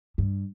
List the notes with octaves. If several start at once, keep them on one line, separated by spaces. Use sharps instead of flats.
G2